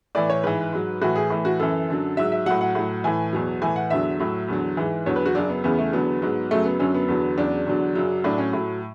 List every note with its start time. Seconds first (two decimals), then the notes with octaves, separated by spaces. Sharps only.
0.15 A2 E3 D5
0.30 C#5
0.44 G#2 E3 B4
0.73 G#2 F#3
1.01 A2 E3 F#4
1.16 G#4
1.30 A2 E3
1.45 F#4
1.59 F#2 E3 A4
1.88 F#2 D3 F#3
2.17 G#2 F#3 E5
2.32 E5
2.46 A2 F#3 F#5
2.61 F#5
2.75 A2 F#3
3.04 A2 E3 G#5
3.33 E2 B2 F#3
3.62 A2 E3 G#5
3.76 F#5
3.90 E2 D3 F#3 E5
4.19 A2 F#3
4.48 E2 D3 F#3
4.77 G#2 E3
5.06 E2 D3 F#3 C#5
5.16 B4
5.26 F#4
5.35 F#2 C#3 F#3 D4
5.50 B3
5.64 E2 C#3 E3 B3
5.79 A3
5.93 E2 D3 F#3 B3
6.22 G#2 F#3
6.51 F#2 C#3 F#3 A3
6.66 B3
6.80 F#2 D3 F#3 C#4
6.94 B3
7.08 E2 D3 F#3
7.38 E2 C#3 F#3 D4
7.66 E2 D3 F#3
7.95 F#2 C#3 F#3
8.24 A2 F#3 D4
8.38 C#4
8.53 A2 F#3